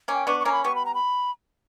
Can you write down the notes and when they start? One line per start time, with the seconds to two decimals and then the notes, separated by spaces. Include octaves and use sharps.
0.08 A#3 C#4
0.14 G5
0.27 B3 D4 C#6
0.40 C#6
0.45 A#3 C#4 A#5
0.52 B5
0.64 G3 B3 C#6
0.75 B5
0.85 A#5
0.94 B5